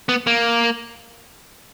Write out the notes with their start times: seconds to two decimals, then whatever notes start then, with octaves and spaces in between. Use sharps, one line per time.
0.09 B3
0.27 A#3